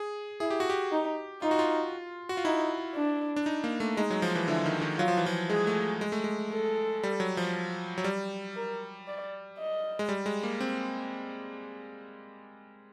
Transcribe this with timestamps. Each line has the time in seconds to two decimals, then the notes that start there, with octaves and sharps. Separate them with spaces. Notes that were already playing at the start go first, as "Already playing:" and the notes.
Already playing: G#4
0.40 E4 G#4
0.50 G4
0.60 F#4
0.70 G4
0.92 D#4
1.42 D#4 F4
1.51 F#4
1.59 F4
2.29 F#4
2.37 F4
2.45 D#4 E4
2.95 D4
3.36 D4
3.46 D#4
3.64 A#3
3.80 A3
3.97 G#3 D#4
4.10 F#3
4.22 F3
4.35 E3
4.48 D3 E4
4.66 D#3
4.81 D#3
4.98 F#3 F4
5.08 F3
5.17 E3
5.26 F3
5.50 G#3 G#4
5.67 A3
6.01 G#3
6.12 A3
6.24 G#3
6.53 A4
7.03 G3
7.20 F#3
7.37 F3
7.98 F#3
8.04 G3
8.56 A#4
9.08 D5
9.59 D#5
9.99 G#3
10.09 G3
10.26 G#3
10.43 A#3
10.60 C4